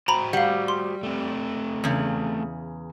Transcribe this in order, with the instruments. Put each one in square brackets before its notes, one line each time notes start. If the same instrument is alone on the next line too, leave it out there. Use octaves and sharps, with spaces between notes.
[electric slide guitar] F#4 C5 G5 [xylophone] A#5 B5
[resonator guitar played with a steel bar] G3 [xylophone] F5 F#5
[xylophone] C6
[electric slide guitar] A3 C4
[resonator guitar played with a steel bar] E2 C#3